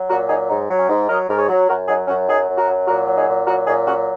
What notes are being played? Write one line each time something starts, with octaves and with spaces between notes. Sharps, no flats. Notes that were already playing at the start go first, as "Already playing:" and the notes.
Already playing: F#3
A#2 F#4 A#4
F#3 D#4 G#4
G#2 D#4
F#3
C#4
G#2
F#3 A#4 D#5
G#2 A#4
G#4 C#5
F#3
F#2 F#4 A#4
F#3 D#4 G#4
F#2 C#4 F#4
F#3 D#4 G#4
F#2
F#4 A#4
F#3
A#2 F#4 A#4
F#3
D#4 G#4
A#2
F#3 F#4 A#4
A#2 D#4 G#4
F#3 C#4 F#4